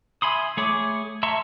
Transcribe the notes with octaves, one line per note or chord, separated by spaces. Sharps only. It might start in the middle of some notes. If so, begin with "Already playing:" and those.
E5 G#5 B5 C6 D#6
A3 G#4 C#5 C#6 D6
E5 A5 A#5 C6 C#6